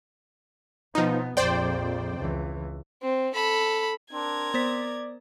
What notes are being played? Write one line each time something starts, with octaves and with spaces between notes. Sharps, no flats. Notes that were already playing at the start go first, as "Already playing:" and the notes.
B2 F3 B3 D#4
A#1 F2 C5 D5 G5
C#2 E3
C4
A4 B5
C4 D4 A#4 G#6
B3 C5 D5 B6